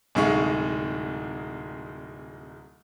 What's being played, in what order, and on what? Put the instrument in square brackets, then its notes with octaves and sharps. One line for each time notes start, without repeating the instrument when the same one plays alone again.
[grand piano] D1 C2 G#3 D#4 E5 C#6